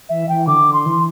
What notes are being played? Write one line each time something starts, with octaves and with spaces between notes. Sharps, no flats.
E3 E5
E3 G5
D3 D6
C6
E3